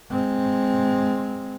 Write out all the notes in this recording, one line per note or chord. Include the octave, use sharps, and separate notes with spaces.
G#3 C4